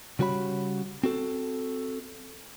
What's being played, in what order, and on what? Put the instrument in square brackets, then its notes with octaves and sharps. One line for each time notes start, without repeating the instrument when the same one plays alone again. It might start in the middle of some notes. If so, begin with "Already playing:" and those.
[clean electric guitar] C#3 G3 F#4 C#5 B5
C4 F#4 A4